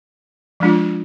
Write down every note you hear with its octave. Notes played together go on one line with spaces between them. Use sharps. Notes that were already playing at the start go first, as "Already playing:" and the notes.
F3 G#3 D4 F4